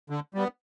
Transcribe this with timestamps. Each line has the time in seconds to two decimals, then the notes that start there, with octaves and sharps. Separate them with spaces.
0.10 D3
0.34 G3 B3